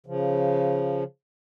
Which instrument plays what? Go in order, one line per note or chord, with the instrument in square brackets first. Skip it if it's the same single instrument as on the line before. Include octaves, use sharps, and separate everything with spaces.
[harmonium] C#3 F3